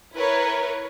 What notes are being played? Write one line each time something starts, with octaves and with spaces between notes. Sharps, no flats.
E4 A#4 B4 C#5